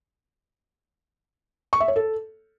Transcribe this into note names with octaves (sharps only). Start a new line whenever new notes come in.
C#6
E5
C#5
A4